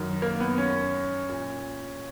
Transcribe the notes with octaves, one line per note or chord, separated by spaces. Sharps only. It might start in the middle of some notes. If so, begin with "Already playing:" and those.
Already playing: F#2 D#3
A#3
B3
C#4
A#2